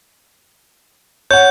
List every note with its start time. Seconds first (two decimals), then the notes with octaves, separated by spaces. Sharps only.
1.31 C#5 F#5 G6